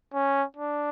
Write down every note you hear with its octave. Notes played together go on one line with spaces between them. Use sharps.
C#4
D4